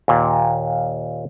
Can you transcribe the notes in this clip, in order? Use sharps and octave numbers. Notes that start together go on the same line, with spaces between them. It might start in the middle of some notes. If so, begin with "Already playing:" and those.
D#2 A#2